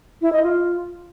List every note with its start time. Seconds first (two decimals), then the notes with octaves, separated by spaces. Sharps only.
0.22 E4
0.32 D#5
0.43 F4